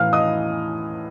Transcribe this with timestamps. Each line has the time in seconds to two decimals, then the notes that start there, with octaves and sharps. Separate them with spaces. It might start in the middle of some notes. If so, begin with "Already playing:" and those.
Already playing: A2 E3 F5 F6
0.13 D#5 D#6